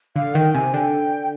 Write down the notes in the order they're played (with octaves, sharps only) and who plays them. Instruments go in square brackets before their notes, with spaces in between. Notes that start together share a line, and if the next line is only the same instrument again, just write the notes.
[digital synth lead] D3 [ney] F5
[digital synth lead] D#3 [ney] G5
[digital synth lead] C3 [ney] G#5
[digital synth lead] D3 [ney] G5